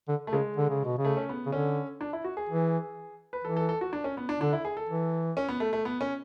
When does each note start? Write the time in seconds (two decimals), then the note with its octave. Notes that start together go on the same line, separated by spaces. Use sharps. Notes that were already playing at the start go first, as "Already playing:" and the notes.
0.08 D3
0.27 A3
0.33 C#3 G#3
0.57 D3
0.70 C#3
0.84 B2
0.98 C#3
1.05 A3
1.17 C#4
1.29 B3
1.46 C#3
1.52 D3 C#4
2.01 D4
2.13 E4
2.24 F#4
2.37 G#4
2.49 E3
3.33 B4
3.44 E3 A4
3.57 A4
3.69 A4
3.81 F#4
3.93 D4
4.04 C#4
4.17 B3
4.29 D4
4.41 D3 D4
4.53 E4
4.65 G#4
4.77 A4
4.89 E3
5.37 C#4
5.48 B3
5.60 A3
5.73 A3
5.85 B3
6.01 C#4